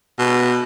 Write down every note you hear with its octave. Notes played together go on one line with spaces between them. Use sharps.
B2